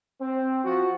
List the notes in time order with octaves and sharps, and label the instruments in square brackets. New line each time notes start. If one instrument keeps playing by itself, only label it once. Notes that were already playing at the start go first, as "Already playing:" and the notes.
[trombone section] C4
F3 F#4